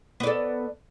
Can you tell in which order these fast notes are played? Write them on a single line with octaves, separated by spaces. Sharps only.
B3 D5 A4